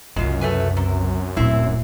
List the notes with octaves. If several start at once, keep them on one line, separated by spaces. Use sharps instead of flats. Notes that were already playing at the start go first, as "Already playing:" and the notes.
C2 F#2 C#3 G#3 F4
A3 B4 G#5
C3
D1 A#2 C4 E4